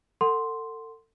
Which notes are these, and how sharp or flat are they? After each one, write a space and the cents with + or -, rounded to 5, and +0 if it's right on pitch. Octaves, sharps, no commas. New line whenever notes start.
A4 +35 F#5 +0 C6 +0